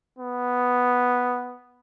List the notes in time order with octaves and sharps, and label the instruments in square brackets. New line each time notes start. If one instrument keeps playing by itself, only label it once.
[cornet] B3